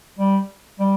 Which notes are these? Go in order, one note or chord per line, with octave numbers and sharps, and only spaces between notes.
G3
G3